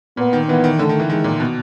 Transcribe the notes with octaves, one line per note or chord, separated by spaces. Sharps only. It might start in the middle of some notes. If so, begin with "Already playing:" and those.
A#2 B3
D#3
E3 B3
D#3
D3 A3
D#3
E3
D#3 G#3
A#2
B2